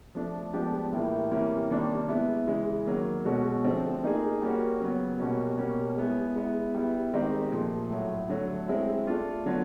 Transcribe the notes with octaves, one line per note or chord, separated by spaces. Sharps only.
F3 A3 D4
F3 G#3 B3 D4 G4
A2 E3 G3 A#3
C3 E3 G3 A#3 C#4
C3 D#3 G3 A#3 D4
G#3 B3 E4
C#3 E3 G#3
D#3 F#3 A#3
B2 G#3 C#4 F#4 A4
D3 F3 A3 C4
A#3 D#4 G#4
G3 A#3 C#4 F#4
C#3 F#3 B3
B2 G3 A#3 C#4 F#4
B2 G3 A#3 C#4
G#3 B3 E4 G#4
G#3 B3 E4
G3 B3 E4
D#3 G#3 C4 D#4 G4
A#2 F3 A3
A2 F#3 A3
D3 F#3 A3
G#3 C4 E4
A3 D4 F4
D3 F#3 B3